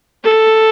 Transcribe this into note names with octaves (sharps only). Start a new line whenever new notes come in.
A4